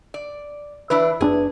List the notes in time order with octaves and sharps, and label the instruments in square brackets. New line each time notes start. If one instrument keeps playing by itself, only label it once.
[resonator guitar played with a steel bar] D5
[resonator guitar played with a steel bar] E3 D4 E4 [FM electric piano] B4
[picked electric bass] F#1 C#4 D4 [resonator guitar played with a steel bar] G#4